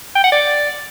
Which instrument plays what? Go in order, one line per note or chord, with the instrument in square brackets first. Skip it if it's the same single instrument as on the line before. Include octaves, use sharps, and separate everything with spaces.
[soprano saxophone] G5
F#5
D5